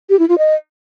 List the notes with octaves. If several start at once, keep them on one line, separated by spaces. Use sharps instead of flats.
G4
E4
F4
D#5